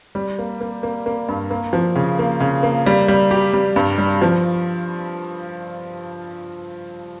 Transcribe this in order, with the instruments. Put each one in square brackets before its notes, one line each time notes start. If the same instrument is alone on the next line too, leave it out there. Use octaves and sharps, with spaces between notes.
[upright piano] G3
A#3
A#3
A#3
A#3
G2
A#3
F3
C#3
A#3
C#3
A#3
G3
G3
G4
G3
G2
G3
F3